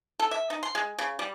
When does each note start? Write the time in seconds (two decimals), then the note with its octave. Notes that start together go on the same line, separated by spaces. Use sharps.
0.20 A4
0.31 E5
0.50 D#4
0.63 C6
0.75 G#3
0.99 C#3
1.19 G3